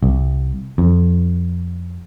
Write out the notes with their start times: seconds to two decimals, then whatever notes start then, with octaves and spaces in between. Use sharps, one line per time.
0.03 C2
0.78 F2